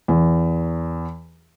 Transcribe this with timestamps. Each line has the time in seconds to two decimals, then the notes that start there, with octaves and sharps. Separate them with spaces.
0.08 E2